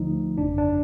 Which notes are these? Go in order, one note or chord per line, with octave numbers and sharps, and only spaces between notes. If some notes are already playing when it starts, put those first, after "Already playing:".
Already playing: D2 D3 F3 A3 D#4
G1 F2 C#3 D4
D4